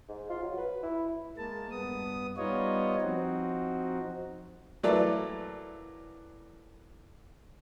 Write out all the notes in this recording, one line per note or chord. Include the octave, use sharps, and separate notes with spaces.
G#2
F4
F#3
B4
E4
G#3 A#3 A5
G2 B3 D#6
G3 B3 D#4 F4 C#5 D#5
F3 C4 D#4 F#4
E3 F#3 A3 A#3 E4 D5